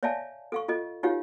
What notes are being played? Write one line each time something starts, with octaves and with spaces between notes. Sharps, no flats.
C#5 D5 E5 F5 G#5 A5
A4 F5 C#6
F4 A4 D#5
D#4 F4 G4 C#5 F5